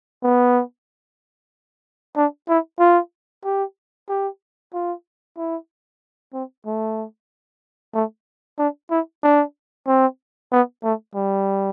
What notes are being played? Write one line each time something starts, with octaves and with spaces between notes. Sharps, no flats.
B3
D4
E4
F4
G4
G4
F4
E4
C4
A3
A3
D4
E4
D4
C4
B3
A3
G3